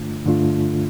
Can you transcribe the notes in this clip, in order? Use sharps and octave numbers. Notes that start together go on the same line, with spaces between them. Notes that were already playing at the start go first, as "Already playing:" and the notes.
Already playing: G2 D3 A3 D4 F4
G2 D3 A3 D4 F4